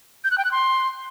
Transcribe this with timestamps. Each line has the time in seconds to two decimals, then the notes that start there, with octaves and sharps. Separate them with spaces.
0.24 G6
0.31 F#6
0.38 G5
0.45 F#6
0.52 C6